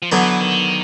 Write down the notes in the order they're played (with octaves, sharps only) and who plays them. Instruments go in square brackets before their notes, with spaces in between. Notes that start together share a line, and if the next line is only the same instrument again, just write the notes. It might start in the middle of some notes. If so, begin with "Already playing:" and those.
[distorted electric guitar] F3
[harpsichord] D3 F#3 B3 [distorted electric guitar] E3
[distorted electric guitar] D#3